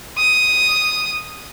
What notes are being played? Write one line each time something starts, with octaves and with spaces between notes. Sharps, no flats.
D#6